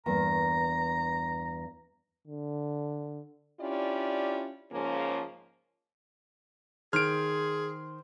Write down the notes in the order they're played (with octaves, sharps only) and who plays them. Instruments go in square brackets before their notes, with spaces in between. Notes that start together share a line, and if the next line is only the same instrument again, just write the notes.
[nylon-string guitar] E2 G2 A#3 [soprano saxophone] A#5
[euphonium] D3
[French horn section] C#4 D4 E4 F4 G4 D5
G#2 C#3 F3 A#3 C#4
[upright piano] D#3 [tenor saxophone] G#4 [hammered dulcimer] C5 [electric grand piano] F6 D7